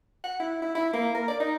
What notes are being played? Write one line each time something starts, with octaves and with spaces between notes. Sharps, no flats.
F#5
E4
E4
E4
A#3
A#4
D5
D#4